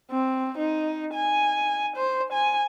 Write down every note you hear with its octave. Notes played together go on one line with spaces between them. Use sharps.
C4
D#4
G#5
C5
G#5